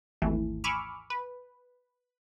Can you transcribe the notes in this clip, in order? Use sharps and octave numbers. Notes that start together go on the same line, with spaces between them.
G#1 D#2 E3 A3
G#5 B5 C#6 D6 E6 F6
B4